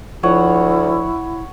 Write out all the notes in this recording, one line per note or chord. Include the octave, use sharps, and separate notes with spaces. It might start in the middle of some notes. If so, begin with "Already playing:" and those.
D2 F3 E4 C#5 F#5